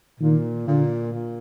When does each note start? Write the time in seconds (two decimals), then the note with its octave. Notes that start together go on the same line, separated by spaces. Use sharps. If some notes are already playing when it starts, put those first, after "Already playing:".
0.20 A#2 D#3
0.67 A#2 D3
1.14 A#2